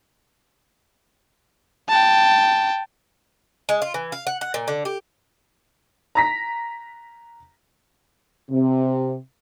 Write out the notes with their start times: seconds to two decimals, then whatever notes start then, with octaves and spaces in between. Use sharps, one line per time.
1.89 G5 A5
3.69 G#3
3.82 F4
3.94 E3
4.12 F5
4.27 F#5
4.41 F#5
4.54 A#2
4.68 D3
4.85 G4
6.15 A#5 A#6 B6
8.50 C3